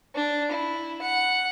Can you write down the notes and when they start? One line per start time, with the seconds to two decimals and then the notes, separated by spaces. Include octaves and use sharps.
0.15 D4
0.51 E4
1.02 F#5